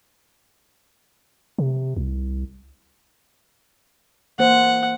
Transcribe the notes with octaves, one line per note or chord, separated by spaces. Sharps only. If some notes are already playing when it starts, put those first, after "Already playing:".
C3
C2
E3 A#3 C5 F#5